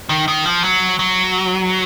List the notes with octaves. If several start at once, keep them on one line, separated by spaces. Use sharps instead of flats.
D#3
D#3
F3
F#3
F#3